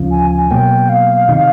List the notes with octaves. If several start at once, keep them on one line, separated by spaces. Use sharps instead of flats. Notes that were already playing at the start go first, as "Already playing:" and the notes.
Already playing: D2 C#3 F3
G#5
G#5
B2 F#3 A#3 G5
F5
C3 D#3